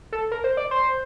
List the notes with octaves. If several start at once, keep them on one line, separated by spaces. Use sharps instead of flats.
A4
A#4
C5
D5
C5